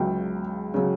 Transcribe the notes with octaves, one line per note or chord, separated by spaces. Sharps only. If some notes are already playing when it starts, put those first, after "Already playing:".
Already playing: C#2 C#3 F#3 G5
C#3 F#3